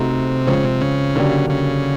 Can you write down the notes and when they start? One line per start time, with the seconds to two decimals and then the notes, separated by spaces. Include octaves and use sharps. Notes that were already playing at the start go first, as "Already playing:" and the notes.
Already playing: C3 A3 C4 D#4 F#4 A4
0.47 C#3 F3 G#3 C4
0.64 C3
0.81 C#3
1.16 D3 F#3 A#3 D4 G4
1.50 C#3